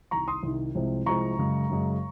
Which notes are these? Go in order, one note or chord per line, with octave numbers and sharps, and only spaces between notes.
C2 C3 D#3 A#5 C#6
C6 D#6
C2 C3 D#3
C2 C3 F3 G#3 C4
C2 C3 F3 G#3 C4 A#5 C#6
F#2 C#3 G#3
F#2 C#3 G#3